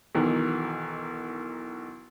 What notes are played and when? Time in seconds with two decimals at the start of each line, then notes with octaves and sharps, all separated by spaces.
0.15 B1 D#3 E3